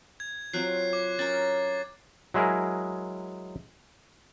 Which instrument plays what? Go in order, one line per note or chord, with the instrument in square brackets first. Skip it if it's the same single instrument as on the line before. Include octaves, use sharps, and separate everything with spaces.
[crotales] G#6
[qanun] F#3 C4 F4 [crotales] F#6 C7
[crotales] D6
[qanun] C#4 A#4 [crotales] A6
[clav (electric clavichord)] F#3 G#3 E4 G#4 A#4